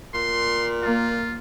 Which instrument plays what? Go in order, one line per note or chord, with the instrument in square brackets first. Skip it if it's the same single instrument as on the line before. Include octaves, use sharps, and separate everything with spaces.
[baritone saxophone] A#2 [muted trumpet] C6
[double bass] A#3 [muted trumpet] F4